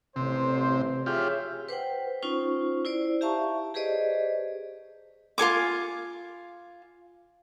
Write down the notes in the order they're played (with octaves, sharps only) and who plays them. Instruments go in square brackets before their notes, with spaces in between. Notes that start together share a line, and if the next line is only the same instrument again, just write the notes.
[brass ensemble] A1 C5 [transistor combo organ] C3
[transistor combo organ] F4 G4 [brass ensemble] G#4 C#5 E5
[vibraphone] B4 C5 F#5 G5
C#4 D#4 F4 C5 C#6
E4 C5 D5
G4 E5 F5 A5 A#5 C#6
G4 G#4 B4 C5 D5 D#5
[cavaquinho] F4 A4 G#5 D6